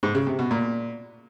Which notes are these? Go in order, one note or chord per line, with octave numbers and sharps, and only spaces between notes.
G#2
C#3
C3
B2
A#2